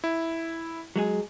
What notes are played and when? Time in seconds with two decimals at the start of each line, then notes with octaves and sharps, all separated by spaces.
0.04 E4
0.96 F#3 G#3 G#4